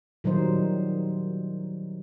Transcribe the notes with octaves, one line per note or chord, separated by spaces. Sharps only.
A#2 D#3 F#3 G3 D#4 C5